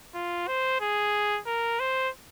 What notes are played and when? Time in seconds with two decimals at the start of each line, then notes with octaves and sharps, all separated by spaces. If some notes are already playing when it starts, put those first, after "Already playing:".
0.15 F4
0.48 C5
0.81 G#4
1.46 A#4
1.80 C5